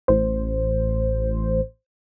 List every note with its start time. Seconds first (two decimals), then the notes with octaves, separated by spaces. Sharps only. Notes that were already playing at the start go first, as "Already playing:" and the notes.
0.08 A1 C5